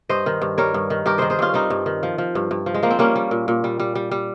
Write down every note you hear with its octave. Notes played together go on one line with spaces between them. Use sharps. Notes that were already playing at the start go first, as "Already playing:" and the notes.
G2 C5 D#5
D#3
G2
G3 A#4 C#5
G2
D#3
G2 G4 A#4
D#3 G#4 C5
G#4 C5
G2 C#4 F4
G3 C4 D#4
G2
D#3
F3
F3
G2
G2
F3
G#3
F3 A#3
C4
G3 A#3 C#4
G3
A#2
A#2
G3
G3
G3
G3